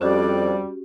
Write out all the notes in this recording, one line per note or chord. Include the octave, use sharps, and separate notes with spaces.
F2 G3 C#4 F#4 G4 D5